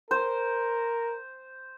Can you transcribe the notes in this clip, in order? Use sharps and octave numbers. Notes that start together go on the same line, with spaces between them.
A#4 C5